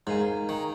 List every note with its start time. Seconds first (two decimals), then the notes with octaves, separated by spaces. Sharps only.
0.07 G#2 D#4 A#4 F5 G#5
0.49 D#3